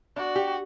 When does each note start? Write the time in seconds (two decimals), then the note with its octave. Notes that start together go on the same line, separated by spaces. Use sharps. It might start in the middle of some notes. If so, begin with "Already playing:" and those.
0.16 D4 F#4
0.36 G4